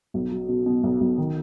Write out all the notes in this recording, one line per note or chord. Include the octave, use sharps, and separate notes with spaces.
B1
F#3
B2
B2
B1
B1
D#3